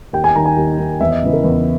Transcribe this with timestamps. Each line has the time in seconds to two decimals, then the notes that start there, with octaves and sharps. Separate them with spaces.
0.13 D#2 G5
0.24 G#5
0.36 D#3 A#5
0.46 G#5
0.57 D#2
0.79 D#3
1.01 E2 E5
1.11 D#5
1.22 C#3 E3
1.33 A#4
1.44 E2